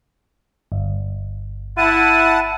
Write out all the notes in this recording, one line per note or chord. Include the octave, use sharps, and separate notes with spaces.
G1
E4 F#5 A5 D#7